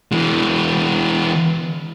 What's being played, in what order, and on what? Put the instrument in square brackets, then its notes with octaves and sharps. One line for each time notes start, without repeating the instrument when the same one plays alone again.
[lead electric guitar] E3 G#3